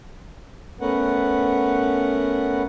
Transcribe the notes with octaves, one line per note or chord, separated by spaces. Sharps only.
A3 B3 C#4 A#4 B4 F#5